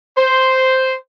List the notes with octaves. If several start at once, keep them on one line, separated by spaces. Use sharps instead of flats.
C5